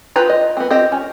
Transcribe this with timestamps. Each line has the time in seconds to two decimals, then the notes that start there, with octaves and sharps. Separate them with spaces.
0.16 F4 G4 B4 A#5
0.30 D#5
0.57 B3 C4
0.70 C4 F4 G4 D#5
0.92 C#4